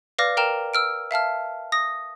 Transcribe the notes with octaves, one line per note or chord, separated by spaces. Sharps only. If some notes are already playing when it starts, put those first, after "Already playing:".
B4 D5 F5 D6 F6 A#6
A#4 G5 A#5 F6 E7
E6 F6 D7
E5 F5 A5 F6
D#6 A#6